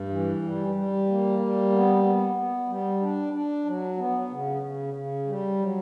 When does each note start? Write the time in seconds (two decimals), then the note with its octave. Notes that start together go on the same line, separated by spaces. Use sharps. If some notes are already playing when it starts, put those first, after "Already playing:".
Already playing: G2
0.09 E3
0.42 G3
0.75 G3
1.07 A#3
1.39 G3
1.71 B3
2.04 B3
2.36 B3
2.68 G3
3.01 D4
3.33 D4
3.65 F#3
3.97 B3
4.30 C#3
4.62 C#3
4.94 C#3
5.26 G3
5.59 F#3